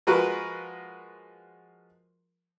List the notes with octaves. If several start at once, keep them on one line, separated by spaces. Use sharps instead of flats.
F3 G#3 F#4 A#4 B4